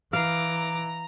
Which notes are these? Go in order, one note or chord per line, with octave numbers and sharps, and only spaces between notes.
E3 F5 A#5 D6